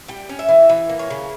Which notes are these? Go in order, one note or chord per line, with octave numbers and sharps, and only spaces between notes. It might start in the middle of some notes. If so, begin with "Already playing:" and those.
G3 G5
C#4
E5
E3
E3
A#3
C#5
C#3